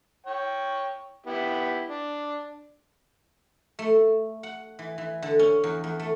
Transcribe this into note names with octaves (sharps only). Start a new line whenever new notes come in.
C#5 G5
B3 E4 G4
D4
A3
F#5
E3
E3
D3
C#4
E2
E2
A3